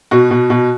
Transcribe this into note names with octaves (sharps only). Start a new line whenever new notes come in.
B2 F#4
B2
B2